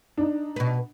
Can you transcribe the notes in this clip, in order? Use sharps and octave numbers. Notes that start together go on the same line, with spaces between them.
D4 D#4
B2 B4